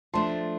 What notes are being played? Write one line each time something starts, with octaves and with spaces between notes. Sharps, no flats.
F3 A3 D4 A5 C6